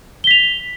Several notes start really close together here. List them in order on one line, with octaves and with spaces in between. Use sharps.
G7 B6 F7